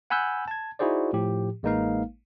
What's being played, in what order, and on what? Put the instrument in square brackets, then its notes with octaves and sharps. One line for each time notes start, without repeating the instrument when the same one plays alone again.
[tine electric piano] F#5 G#5 B5 E6 F#6 G6
A5 G#6
D#4 E4 F#4 G#4 C5 D5
A2 F3 G4
A1 G#3 A#3 D#4 B4 F5